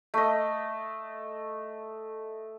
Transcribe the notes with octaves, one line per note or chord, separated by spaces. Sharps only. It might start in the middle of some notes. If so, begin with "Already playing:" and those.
A3 D#5